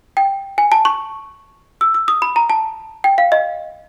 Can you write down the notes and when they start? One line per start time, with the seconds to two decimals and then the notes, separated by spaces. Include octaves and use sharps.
0.17 G5
0.58 G#5
0.72 A5
0.85 C#6
1.81 E6
1.94 E6
2.08 D#6
2.22 B5
2.36 A#5
2.50 A5
3.04 G5
3.18 F5
3.32 D#5